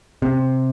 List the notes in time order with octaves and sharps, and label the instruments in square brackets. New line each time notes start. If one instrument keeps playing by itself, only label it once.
[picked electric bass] C3